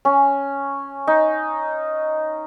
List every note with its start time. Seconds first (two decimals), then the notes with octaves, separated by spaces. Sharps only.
0.05 C#4
1.07 D#4